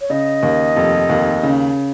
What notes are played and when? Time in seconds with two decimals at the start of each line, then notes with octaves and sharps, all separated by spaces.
0.01 C#5
0.10 C#3 D#5
0.43 D#2
0.76 F1
1.10 D#2
1.43 C#3